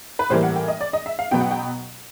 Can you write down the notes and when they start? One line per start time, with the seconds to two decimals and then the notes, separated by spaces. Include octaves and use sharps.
0.19 B4
0.30 A2 E3 G3 A#3 C5
0.43 F#5
0.56 G5
0.68 D#5
0.81 D5
0.93 D#5
1.06 E5
1.19 F5
1.31 B2 F#3 B3 G5
1.41 F#5
1.51 G5